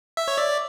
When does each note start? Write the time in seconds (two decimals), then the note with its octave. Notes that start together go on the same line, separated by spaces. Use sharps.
0.17 E5
0.28 C#5
0.38 D5